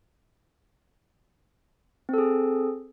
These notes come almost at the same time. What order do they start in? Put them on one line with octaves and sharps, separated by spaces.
C4 A4 G#4